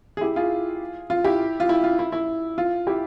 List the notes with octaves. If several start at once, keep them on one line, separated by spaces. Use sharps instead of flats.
G#4
E4 G4
F4 G#4
F4
E4 G4
F4
E4
F4
E4
E4
F4
E4 G4